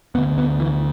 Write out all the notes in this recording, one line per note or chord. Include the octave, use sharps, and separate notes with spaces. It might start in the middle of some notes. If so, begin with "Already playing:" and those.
D2 D3 B3
B3
E3